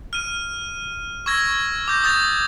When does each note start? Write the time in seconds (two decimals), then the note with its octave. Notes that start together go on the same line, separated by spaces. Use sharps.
0.13 F6 D#7
1.26 C#6 E6 G#6 A#6
1.88 D6 G6 A#6
2.04 D#6 G6 A6 F7